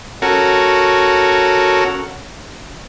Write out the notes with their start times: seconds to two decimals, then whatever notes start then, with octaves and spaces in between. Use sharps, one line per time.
0.22 C#4 F#4 A4 A#4